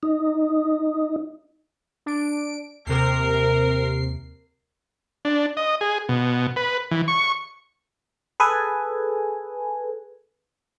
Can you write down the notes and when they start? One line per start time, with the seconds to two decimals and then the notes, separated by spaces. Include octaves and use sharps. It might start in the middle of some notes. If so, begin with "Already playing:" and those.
0.03 D#4
2.06 D4 D7
2.87 D#2 C3 A#4 C7
5.25 D4
5.57 D#5
5.81 G#4
6.09 B2
6.56 B4
6.91 E3
7.08 C#6
8.40 G#4 A4 B4 G#5